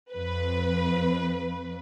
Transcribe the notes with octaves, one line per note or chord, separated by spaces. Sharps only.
F2 B4